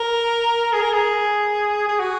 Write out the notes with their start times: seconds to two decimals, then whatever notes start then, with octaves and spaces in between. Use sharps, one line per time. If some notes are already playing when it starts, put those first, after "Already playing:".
Already playing: A#4
0.73 G#4
0.82 A#4
0.93 G#4
1.88 G#4
2.00 F#4